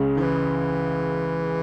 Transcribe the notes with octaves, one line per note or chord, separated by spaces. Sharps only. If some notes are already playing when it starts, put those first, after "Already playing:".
Already playing: C#2 C#3 G#3
D#3
E3